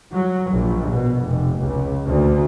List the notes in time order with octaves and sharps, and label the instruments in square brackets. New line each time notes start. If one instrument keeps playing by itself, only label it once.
[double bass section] F#3
A#1
B2
F1
C#2
D2